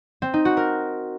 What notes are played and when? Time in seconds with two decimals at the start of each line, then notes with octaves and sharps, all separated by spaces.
0.22 C4
0.34 D#4
0.45 F#4
0.57 A#4